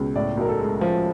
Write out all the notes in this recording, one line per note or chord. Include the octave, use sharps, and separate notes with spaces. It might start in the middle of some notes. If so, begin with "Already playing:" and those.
Already playing: C#2 B2
A2 D5
B1 A#4
A4
G#3
F3